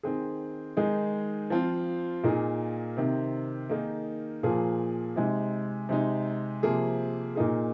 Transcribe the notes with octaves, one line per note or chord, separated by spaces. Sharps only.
D#3 C4 G#4
D#3 G#3 D#4 G#4
F3 C4 F4
A#2 A#3 D#4 G#4
C3 D#3 C4
D#3 A#3 D#4 G#4
A#2 F3 A#3 G#4
C3 G#3 D#4
C3 G#3 D#4
C3 F3 A#3 G#4
A#2 A#3 D#4 G#4